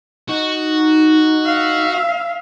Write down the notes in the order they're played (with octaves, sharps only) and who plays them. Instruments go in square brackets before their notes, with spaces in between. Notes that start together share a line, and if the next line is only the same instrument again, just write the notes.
[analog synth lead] D#4 [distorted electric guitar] F#4
[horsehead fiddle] E5 F5